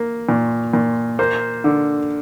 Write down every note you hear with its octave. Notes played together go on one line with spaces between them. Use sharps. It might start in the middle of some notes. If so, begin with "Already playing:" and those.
Already playing: A#3
A#2
A#2
A#3 C5
D3